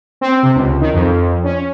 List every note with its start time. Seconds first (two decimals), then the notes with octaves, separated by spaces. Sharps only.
0.21 C4
0.43 C3
0.55 C#2
0.81 D#3
0.94 F2
1.44 C#4